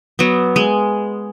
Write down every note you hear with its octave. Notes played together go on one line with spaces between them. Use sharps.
F#3 B3
G#3